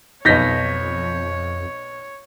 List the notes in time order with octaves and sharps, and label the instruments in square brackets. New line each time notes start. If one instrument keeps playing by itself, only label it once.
[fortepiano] B1 D#4 [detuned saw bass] F2 [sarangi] C#5 [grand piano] G6 A#6 B6